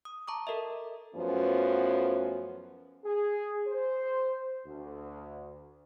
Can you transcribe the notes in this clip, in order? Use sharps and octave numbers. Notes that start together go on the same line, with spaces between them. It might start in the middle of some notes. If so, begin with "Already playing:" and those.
D#6
A5 A#5 C#6 D6
A4 A#4 D#5 E5
F#2 F3 A3 B3 C#4
G#4
C5
D2